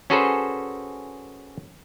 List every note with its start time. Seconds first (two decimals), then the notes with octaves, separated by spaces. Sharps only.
0.10 C#4 F#4 G#4 A4 B4 C5